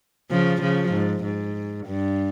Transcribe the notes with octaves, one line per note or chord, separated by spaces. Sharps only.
C#3 F3
C#3 F3
G#2
G#2
G2